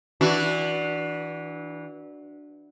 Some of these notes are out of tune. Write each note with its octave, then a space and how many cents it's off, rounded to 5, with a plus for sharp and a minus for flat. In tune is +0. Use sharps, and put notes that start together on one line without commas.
E3 -25 D4 +0 F#4 +0